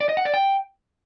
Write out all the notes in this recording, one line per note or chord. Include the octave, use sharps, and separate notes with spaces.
D5
D#5
F#5
D5
G5